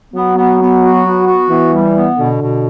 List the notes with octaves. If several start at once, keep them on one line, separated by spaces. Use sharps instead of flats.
F#3 B3
B3
B3
F#4
B3
F#4
E3 B3
G3
B3
B2 D3
B2